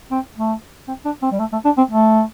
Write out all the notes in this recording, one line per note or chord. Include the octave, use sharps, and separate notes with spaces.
C4
A3
C4
D4
C4
G3
A3
A3
D4
C4
A3